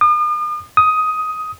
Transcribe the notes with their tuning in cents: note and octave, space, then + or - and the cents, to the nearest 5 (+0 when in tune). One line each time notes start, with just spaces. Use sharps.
D#6 -45
D#6 +10